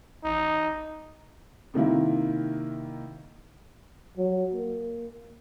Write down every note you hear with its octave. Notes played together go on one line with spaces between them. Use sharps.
A1 D#4
C3 D#3 A#3 E4
F#3
A#3